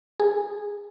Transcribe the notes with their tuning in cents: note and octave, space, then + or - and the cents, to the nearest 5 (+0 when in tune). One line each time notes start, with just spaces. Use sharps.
G#4 -15